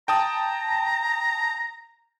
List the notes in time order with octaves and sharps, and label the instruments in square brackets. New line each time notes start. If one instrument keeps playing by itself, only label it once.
[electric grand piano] G5 A5 D#6 [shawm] A#5